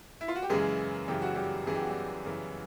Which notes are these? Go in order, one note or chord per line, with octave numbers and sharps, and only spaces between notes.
E4
F4
F#4
G4
F#2 C#3 E3 G#3 G#4
F#2 C#3 E3 G4
F#4
G3 G4
F#2 C#3 E3 G#4
G4
F#4
G3 G4
F#2 C#3 E3